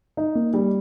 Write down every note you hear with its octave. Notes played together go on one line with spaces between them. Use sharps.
D#4
A#3
G3